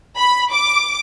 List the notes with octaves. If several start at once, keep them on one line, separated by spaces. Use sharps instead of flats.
B5
D6